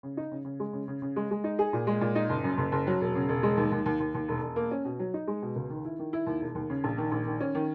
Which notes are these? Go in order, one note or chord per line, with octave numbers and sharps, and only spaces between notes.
C#3
D#4
C#3
C#3
G#3
C#3
C#3
C#3
G#3
G#3
D#4
G#4
A#2
G#3
A#2
D#4
F#1
F#2
F#1
F#1
F#3
E1
C#3
E1
G#3
D#2
D#2
D#2
D#2
D#2
E1
E1
A#3
C#4
B2
F#3
D#4
G#3
B2
C#2
D#3
E4
D#3
E4
D#2
E1
D#2
C#3
A#1
D#3
A#1
D#3
C#4
D#3